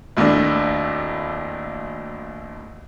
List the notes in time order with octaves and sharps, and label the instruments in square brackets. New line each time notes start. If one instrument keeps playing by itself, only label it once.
[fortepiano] G#1 D#2 A2 D4